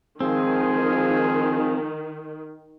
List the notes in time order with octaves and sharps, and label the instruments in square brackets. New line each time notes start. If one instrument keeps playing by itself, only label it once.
[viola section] D#3 [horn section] F3 G#3 G#4 [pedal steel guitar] C4